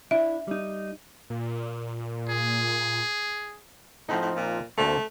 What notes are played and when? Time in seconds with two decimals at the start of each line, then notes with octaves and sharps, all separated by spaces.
0.11 D4 E4 E5
0.48 G3 D#4
1.30 A#2
2.29 G#4
4.09 A2 F3 C4 D#4
4.22 A2
4.36 A#2
4.78 D2 A3 A#3 C4